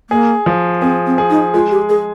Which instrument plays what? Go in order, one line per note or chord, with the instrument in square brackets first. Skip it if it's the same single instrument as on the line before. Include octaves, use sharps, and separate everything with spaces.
[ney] A#3 [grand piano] G#4
[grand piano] F3
[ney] C4 [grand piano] G#4
[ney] C4
[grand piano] G#4
[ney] D#4
[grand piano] G#3 [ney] F4
[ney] G4
[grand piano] G#3 [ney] G#4